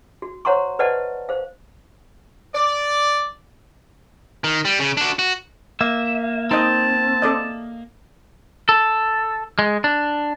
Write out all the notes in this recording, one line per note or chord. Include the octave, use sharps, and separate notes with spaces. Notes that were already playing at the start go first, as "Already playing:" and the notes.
F#4
C5 C#5 F#5 A#5 C6 C#6
B4 C5 D5 D#5 F#5 A5
C5 F5
D5
D#3
G3
C#3
D4 F#4
F#4
A#3 E5
C4 D#4 D#5 A5
A4 D5 D#5
A4
G#3
D4